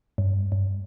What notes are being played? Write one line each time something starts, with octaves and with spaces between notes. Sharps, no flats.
G2
G2